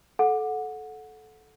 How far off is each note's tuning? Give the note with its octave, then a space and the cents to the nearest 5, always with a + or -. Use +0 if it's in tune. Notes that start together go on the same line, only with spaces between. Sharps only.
A4 -20 F#5 -20